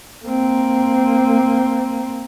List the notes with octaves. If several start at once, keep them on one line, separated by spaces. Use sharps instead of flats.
A#3 C4